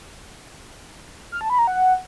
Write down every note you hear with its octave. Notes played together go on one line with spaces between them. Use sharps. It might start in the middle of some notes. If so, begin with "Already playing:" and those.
F6
A5
B5
A#5
F#5